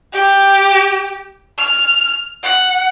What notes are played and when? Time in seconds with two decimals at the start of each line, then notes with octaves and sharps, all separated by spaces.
0.13 G4
1.58 F6
2.43 F#5